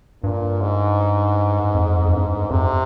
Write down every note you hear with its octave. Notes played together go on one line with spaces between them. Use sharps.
G2 A#2
G#2
F2
F2
G2
F2 C3